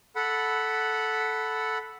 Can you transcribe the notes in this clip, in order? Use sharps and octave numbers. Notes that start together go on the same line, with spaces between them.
A4 F#5 B5